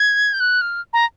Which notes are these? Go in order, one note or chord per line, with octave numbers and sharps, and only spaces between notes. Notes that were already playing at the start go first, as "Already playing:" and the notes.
Already playing: G#6
G6
F#6
F6
A#5